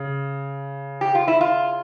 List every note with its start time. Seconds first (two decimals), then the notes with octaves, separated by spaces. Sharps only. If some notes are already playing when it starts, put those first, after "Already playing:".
Already playing: C#3
1.01 G4
1.15 F4
1.28 E4
1.41 F4